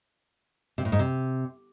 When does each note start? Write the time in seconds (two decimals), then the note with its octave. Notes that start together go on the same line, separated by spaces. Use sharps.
0.78 C3
0.85 A2
0.92 G#2
0.99 C3